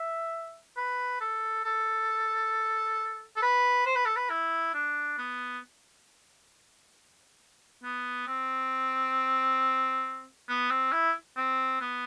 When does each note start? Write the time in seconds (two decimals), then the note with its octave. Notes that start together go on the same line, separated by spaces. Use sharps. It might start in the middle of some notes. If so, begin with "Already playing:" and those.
Already playing: E5
0.77 B4
1.21 A4
1.64 A4
3.36 A4
3.42 B4
3.86 C5
3.95 B4
4.06 A4
4.16 B4
4.30 E4
4.74 D4
5.18 B3
7.84 B3
8.27 C4
10.49 B3
10.70 C4
10.92 E4
11.37 C4
11.81 B3